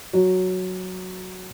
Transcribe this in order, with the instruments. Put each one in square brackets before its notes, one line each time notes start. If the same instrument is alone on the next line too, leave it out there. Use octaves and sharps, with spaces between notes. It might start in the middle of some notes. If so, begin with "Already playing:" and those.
[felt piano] F#3